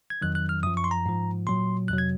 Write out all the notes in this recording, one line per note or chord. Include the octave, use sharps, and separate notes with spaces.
G#6
F2 D#3 F#3 F#6
F#6
F6
F#2 F3 D#6
C#6
C6
A#5
G#2 F3
A#2 F#3 C6
F2 C3 F#3 F#6
G#6